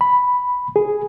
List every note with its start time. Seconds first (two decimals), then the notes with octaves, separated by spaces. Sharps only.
0.01 B5
0.76 G#4